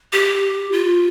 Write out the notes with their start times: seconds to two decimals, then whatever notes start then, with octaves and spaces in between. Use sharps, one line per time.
0.13 G4
0.72 F4